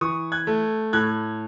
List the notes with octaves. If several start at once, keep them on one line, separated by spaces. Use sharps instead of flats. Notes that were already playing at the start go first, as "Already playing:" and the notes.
E3 C#6 D#6
F#6 G#6
A3
A2 F#6 G#6